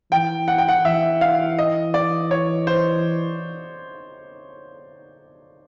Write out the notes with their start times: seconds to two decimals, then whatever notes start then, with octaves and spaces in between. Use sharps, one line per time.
0.11 E3 G5
0.48 F#5
0.58 G5
0.68 F#5
0.85 E3 E5
1.21 F5
1.59 D#5
1.94 D5
2.31 C#5
2.67 C5